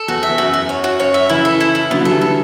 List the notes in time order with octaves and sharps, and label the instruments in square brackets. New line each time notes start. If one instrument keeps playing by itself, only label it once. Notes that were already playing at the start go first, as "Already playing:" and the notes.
Already playing: [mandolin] A4
[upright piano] E2 [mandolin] F#4
[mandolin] E5
[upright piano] E2
[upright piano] F#2 [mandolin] F#4
[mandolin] F#4
C#5
F#4
[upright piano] F#2 [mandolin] C#5
[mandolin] E5
[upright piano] C#3 E3 [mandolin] E4
[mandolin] A4
E4
E4
[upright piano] D3 F#3 [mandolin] B3
[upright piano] D3 F#3
[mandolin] A4
[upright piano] E3 G3
[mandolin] A4